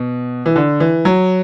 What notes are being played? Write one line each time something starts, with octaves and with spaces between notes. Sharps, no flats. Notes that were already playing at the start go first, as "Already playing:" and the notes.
Already playing: B2
E3
D3
E3
F#3